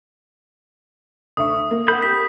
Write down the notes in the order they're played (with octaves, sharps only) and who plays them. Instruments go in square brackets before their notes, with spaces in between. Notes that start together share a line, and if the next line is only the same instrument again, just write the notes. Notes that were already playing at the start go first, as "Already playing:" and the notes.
[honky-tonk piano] D2 E5 C#6 [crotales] D#6
[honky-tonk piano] A#3
[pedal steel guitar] C4 B5 G6 [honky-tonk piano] A#4 F#5
[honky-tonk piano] G4 [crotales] B6